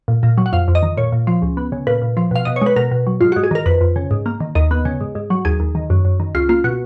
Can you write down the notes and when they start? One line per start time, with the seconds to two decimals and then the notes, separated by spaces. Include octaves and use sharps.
0.08 A#2
0.23 A#2
0.38 F#3
0.46 F#5
0.53 F2 F5
0.68 F2
0.75 D#5
0.83 D#3
0.97 A#2 C#5
1.12 A#2
1.27 F3
1.42 C#2
1.57 B3
1.72 C#3
1.87 A#2 B4
2.02 A#2
2.17 F3
2.31 B2 F5
2.45 B2 D#5
2.56 C#5
2.61 G#3 B4
2.76 B2 A#4
2.91 B2
3.07 F#3
3.21 G#2 F4
3.32 G#2 F#4
3.44 G#4
3.51 D#3 A#4
3.66 F2 B4
3.81 F2
3.96 C#3
4.11 G#2
4.26 A#3
4.41 D#3
4.55 D#2 D#5
4.71 B3
4.85 C#3
5.01 G#2
5.15 G#2
5.30 F#3
5.45 D#2 G#4
5.60 D#2
5.75 D#3
5.90 F#2
6.05 F#2
6.20 D#3
6.35 C#2 F4
6.49 A#3 F4
6.64 B2 F#4